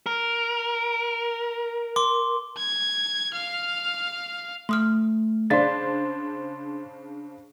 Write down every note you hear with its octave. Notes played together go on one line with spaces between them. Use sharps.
A#4
C6 D6
G#6
F5 F6
A3 C6 D#6 F6
C#3 D4 G#4 C5 D5 F5 C6 A6